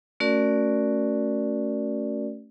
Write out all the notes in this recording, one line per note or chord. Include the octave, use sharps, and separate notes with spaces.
A3 C#4 F#4 A#4 D5